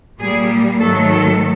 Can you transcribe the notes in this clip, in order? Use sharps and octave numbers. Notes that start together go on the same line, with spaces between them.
A#2 G3 A#3 G#4
G#2 D#3 F#3 A3 A4
A4